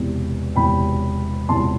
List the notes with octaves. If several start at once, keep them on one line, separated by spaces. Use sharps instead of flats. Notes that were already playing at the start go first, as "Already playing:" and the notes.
Already playing: E1 E2 C3
E1 E2 C3 G5 B5
E1 E2 C3 A5 C6